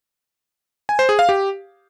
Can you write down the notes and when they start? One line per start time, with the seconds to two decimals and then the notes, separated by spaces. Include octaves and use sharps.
0.89 G#5
0.99 C5
1.09 G#4
1.19 F5
1.29 G4